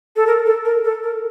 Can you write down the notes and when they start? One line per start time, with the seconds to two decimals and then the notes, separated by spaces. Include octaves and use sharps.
0.16 A4
0.27 A#4
0.46 A4
0.65 A#4
0.84 A4
1.03 A#4